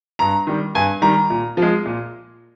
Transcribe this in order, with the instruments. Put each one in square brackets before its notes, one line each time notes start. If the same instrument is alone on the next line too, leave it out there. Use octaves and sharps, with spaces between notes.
[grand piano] G2 A#5
D#3 G3
G2 G#5
D#3 G3 A#5
A#2
F3 G#3
A#2